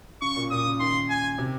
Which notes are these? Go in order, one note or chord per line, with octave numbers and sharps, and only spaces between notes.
C#3 C#6
A#2
A#2 D#6
C#3
D#3 C6
G#5
C3